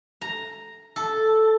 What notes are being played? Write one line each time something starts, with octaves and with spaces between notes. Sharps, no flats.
A#5
A4